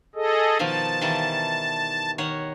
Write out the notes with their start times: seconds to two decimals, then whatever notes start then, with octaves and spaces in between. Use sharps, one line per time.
0.15 G#4 A4 D#5
0.59 B2 D#3 F3 A5
1.01 D#3 E3 G3
2.18 D#3 C#5 F#5